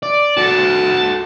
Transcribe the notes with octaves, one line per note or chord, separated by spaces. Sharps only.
D5
F#4 A4 A5